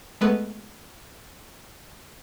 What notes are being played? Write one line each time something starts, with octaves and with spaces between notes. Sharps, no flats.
G#3 A3 B3 B4